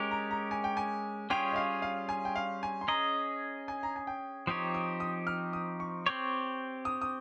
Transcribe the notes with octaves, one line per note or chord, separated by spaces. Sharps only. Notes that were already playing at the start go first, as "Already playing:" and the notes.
Already playing: G#3 C#4 G4 A#4
A#5
A#5
G#5
G5
G#5
G3 C#4 F4 G#4 C#5 G5
D#5
F5
F5
G#5
G5
F5
G#5
C6
C#4 G#4 D#5 A#5
G#5
A#5
G#5
G5
F3 C4 D#4 G4 C#5 D#6
D#6
D#6
F6
D#6
C#6
C4 G4 C#5
D#6
D#6